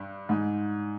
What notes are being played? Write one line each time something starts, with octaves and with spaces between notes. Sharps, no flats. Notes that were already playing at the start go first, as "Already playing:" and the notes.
Already playing: G2
G#2